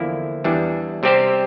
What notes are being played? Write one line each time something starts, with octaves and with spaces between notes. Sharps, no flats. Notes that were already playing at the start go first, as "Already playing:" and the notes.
Already playing: E2 D3 F3 A#3 E4
E2 E3 G3 D4
C3 G3 C4 G4 C5